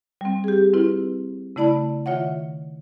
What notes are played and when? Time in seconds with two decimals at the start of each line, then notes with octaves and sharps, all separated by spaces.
0.21 G3 C4
0.44 G4 G#4
0.74 C4 E4 F4 B4
1.56 C#3 A3 E4 D5 A5 B5
2.06 D#3 F4 C#5 E5 F#5